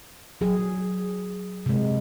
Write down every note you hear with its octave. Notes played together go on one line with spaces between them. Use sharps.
F#3 G#4
C3 G#3